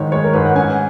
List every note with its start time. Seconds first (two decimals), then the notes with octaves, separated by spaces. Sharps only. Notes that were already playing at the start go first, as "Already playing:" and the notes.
Already playing: G#2 D#3 C#5
0.12 G#3 C#5
0.24 A#4
0.34 G#2 B4
0.45 F#5
0.55 C#4 G#5